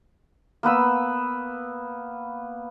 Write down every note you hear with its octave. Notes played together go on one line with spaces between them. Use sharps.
A#3 B3 B4 E6